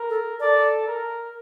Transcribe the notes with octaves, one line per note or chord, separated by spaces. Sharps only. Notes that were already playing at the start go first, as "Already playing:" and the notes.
Already playing: A#4
A4
A4 D5
A#4